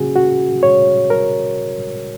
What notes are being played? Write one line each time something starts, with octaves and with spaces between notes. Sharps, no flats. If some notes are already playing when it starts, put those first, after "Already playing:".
Already playing: C#3 A#3 C#4 F#4 G#4
F#4
C#5
A#4